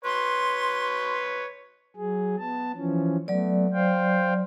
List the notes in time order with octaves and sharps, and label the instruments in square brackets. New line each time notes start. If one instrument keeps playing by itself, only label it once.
[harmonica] B4 C#5 [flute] C6
[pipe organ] F#3 G#4
B3 A5
E3 F3 C#4
[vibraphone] F#3 D5 [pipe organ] A3 B3
[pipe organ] C5 F5 G5